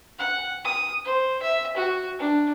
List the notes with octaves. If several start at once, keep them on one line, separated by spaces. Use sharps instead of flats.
F#5
D#6
C5
E5
F#4
D4